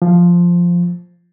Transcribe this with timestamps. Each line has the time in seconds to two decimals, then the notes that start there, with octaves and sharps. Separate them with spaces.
0.02 F3